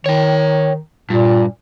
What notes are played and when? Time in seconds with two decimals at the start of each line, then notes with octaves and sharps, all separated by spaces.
0.06 D#3 C#5 G5
1.10 G2 A#2